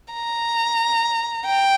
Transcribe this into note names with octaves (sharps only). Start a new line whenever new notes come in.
A#5
G5